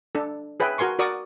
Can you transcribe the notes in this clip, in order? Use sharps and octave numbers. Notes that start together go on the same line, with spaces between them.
D4 A4
G#4 B4 C#5 E5 G5
F#4 A#4 G#5 C6 C#6
F#4 A#4 D5 C#6 D#6